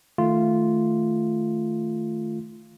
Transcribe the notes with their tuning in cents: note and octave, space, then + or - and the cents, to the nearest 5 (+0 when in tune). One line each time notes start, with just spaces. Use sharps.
D#3 +10 A3 +0 F4 -5